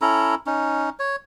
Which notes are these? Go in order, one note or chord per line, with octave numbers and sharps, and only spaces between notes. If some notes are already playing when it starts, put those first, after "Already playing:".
C#4 E4 A4 A#5
C#4 D#4
C#5